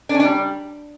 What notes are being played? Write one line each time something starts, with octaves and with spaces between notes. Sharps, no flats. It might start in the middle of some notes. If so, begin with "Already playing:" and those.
D4
C#4
D4
G3